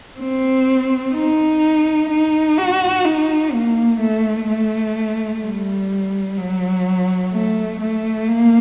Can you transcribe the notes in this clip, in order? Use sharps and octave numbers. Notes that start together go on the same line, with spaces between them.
C4
D#4
D#4
F#4
D#4
A#3
A3
A3
G3
F#3
A3
A3
A#3